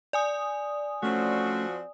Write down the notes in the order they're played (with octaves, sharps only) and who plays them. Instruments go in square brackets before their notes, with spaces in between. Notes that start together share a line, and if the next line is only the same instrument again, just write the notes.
[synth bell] D5 G#5 D#6
[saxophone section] F3 C4 F#4 [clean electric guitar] A3 C#4